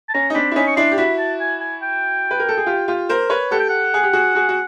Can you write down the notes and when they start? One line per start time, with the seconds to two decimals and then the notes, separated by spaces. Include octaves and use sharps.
0.09 A5
0.14 C#4 A#5
0.30 D#4
0.35 C4 D4 B5
0.52 E4
0.56 C#4 D#4 B5
0.67 C#6
0.77 D4 E4 C6
0.91 G4
0.98 E4 F#4 B5
1.19 A5
1.40 G#5
1.61 G#5
1.82 G5
2.31 B4
2.40 A#4
2.49 A4
2.57 G#4
2.66 F4 G4
2.88 F4 G4
3.09 A#4 C5
3.30 B4 C#5
3.51 G4 A4 F#5
3.60 G5
3.69 F#5
3.94 G#4
4.03 G4
4.13 F#4 G#4
4.35 F#4 G#4
4.49 F#4